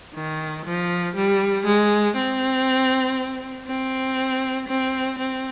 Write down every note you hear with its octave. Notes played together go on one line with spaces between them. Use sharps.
D#3
F3
G3
G#3
C4
C4
C4
C4